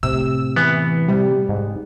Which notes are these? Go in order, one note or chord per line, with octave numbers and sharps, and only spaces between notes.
A2 C3 E6
E3 B3
C3 G3
G#2